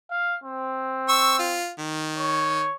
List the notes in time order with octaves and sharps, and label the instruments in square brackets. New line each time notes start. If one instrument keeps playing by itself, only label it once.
[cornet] F5
C4
[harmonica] C#6 E6
F4
D#3
[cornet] C#5